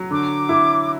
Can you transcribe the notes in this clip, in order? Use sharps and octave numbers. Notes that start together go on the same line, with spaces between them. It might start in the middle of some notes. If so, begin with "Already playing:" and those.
Already playing: F#3
D3 D6
E4